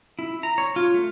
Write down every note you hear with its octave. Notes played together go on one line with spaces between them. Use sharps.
E4
A#5
C#5
F4
A3